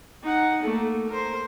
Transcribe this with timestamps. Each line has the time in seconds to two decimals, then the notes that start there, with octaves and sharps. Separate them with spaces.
0.23 D#4 F#5
0.62 A3 A#3
1.08 A#4 C5